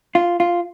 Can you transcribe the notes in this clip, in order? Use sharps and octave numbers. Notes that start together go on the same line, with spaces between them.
F4
F4